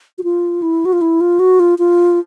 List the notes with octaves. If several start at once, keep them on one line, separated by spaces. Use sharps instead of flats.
F#4
F4
E4
F#4
F4
E4
F4
F#4
F4
F4